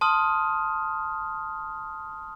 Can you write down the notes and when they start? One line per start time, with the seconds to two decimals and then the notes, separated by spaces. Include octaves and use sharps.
0.01 A5 C6 D#6 F6